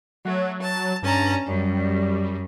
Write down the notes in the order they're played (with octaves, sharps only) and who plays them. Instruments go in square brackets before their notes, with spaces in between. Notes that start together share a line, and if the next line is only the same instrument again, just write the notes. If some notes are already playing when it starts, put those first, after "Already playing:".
[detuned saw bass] F#3 [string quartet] A3
[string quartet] A5
[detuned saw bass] G2 [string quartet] C#4 A5 A#5
[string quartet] F#2 [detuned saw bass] G3